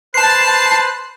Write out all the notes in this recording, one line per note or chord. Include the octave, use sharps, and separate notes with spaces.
B4 C5 A5 F#6 C7